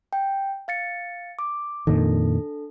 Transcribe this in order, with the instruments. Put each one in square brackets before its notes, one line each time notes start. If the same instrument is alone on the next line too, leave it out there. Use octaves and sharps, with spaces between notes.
[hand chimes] G5
F5 A6 C#7
D6
[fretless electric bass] F2 A#2 D#3 [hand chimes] D4 A4